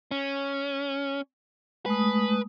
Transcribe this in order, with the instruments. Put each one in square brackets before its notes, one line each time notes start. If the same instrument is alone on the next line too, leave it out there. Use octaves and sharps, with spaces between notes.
[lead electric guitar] C#4
[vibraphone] G#3 A3 D#6 [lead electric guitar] B4